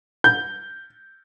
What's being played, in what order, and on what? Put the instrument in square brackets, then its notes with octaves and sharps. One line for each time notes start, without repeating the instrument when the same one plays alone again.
[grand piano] G6